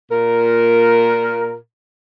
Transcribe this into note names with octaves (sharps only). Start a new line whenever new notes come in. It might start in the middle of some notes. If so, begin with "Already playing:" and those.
A#2 A#4